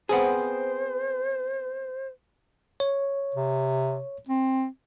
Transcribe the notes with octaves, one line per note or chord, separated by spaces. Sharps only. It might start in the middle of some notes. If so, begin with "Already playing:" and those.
B3 C4 G#4 C5
C#5
C3
C4